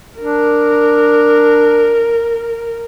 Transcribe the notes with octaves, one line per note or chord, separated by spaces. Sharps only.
D4 A#4